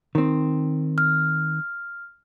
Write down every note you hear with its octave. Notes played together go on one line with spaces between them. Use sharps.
D#3 C4
F6